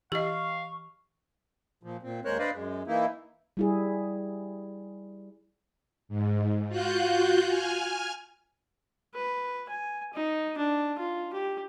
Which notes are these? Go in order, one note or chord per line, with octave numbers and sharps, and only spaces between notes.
E3 G4 D#5 F5 C#6 C7
A#2 F3
A#2 C4
D#2 G#3 A#4 C5 C#5 F#6
D4 B4 C5 D5 D#5 F5
F#2 G#3
E3 A#3 D#4 E4
G3 E4 G#4
G#2
F4 F#4 F#6 G6
G#5 F6
B4
G#5
D#4
D4
F4
G4